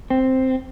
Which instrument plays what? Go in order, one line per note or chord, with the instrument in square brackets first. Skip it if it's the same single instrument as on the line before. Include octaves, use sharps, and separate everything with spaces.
[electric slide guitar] C4